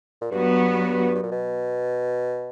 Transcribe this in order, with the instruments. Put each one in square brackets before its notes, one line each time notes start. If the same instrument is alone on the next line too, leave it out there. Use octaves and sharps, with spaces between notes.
[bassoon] A#2
[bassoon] G2 [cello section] F#3 B3 F#4
[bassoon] G2
A#2
B2